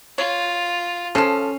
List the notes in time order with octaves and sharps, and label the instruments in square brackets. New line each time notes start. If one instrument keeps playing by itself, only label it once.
[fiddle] F4 [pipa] C#5
[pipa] C#3 F3 [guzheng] C#4 [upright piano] A4 C7 E7